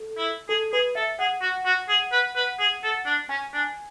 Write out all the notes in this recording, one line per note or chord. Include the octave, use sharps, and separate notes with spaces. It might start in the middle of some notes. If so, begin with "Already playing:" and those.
Already playing: A4
E4
G#4 A4
G#4 B4
A4 E5
G#4 F#5
F#4
F#4
G#4
B4
B4
G#4
A4
D4
C#4 G#5
D4